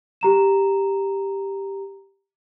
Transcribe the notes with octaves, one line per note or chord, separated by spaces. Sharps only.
G4 A#5 E7